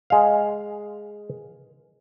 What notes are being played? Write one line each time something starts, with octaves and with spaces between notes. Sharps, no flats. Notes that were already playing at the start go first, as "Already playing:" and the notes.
G#3 F5